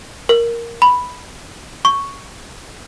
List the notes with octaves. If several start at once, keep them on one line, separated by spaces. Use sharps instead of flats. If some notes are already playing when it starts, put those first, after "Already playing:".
A#4
B5
C#6